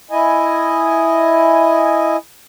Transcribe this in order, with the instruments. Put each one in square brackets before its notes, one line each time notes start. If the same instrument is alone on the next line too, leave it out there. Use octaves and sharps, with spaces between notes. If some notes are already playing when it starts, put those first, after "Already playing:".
[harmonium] E4 D#5 G#5